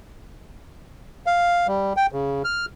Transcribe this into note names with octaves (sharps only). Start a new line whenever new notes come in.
F5
G3
G5
C#3
F6